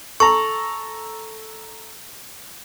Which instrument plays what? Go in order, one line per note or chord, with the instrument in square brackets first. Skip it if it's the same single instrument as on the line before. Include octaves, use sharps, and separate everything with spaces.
[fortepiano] A4 A#5 [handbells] C#6